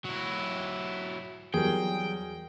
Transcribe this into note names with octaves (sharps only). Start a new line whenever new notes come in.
F#3 E4
E2 F#3 G3 G#4 A#4 G5